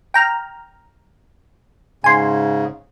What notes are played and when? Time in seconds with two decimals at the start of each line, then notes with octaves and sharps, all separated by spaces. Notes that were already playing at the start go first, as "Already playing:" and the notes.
0.14 G5 A#5 F6
2.04 G#2 C#3 G#5 C6